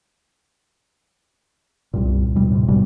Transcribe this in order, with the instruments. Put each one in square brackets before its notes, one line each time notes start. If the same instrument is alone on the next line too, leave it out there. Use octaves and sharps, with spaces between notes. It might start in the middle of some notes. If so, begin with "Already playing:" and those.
[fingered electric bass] C2 G2 A#2
D#2 B2 G3
A2 C3
A1 G#2 B2 G3